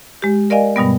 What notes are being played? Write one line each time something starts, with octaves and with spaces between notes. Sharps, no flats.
G#3 G4
A#4 D5 D#5 F5 G#5
G2 B2 G3 B3